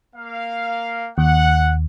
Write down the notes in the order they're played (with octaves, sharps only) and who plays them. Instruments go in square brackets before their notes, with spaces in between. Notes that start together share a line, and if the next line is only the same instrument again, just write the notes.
[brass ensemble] A#3 F5
[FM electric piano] D#2 [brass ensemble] F#5